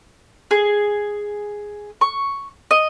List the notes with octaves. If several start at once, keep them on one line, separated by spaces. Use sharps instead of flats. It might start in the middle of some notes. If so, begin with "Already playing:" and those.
G#4
C#6
D#5